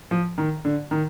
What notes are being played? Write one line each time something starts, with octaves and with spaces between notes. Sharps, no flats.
F3
D#3
D3
D#3